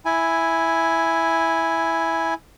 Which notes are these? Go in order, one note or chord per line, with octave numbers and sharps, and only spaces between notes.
E4 G#5